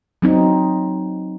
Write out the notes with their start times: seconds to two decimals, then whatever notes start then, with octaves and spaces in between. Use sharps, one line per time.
0.22 F#3 C4 D#4